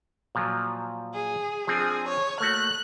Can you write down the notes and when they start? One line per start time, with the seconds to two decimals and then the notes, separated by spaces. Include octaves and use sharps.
0.35 A#2 F3 F#3
1.14 G#4
1.67 F3 C4 D4 G#4
2.08 C#5
2.40 A3 A#3 F#4 F#6